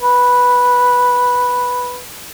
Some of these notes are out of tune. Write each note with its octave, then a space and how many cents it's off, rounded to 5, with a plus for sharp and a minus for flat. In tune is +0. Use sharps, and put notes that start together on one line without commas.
B4 -5